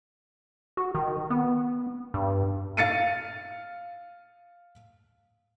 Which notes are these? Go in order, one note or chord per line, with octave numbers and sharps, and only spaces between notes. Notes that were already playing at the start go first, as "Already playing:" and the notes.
F#4
D#3
B3
G2
F5 A6 C#7 D#7